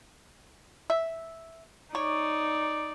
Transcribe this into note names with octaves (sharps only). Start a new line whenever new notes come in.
E5
D#4 C#5 D5